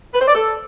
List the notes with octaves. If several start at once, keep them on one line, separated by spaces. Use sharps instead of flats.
B4
C5
D5
A4